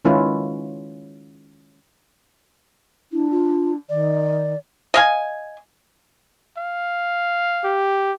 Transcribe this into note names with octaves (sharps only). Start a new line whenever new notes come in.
D#3 G#3 C#4 E4 F4 B4
D4 E4
F4
D#3 D5
D#5 F5 G#5
F5
G4